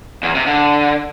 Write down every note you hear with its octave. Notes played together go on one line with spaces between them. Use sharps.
E2
C3
D3